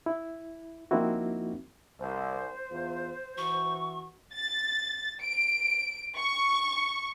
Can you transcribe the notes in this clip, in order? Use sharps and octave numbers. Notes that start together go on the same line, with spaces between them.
E4
F3 A#3 C4 D#4 E4 F#4
C2 C5
E2 F4
E3 F#4 C#6
A6
D7
C#6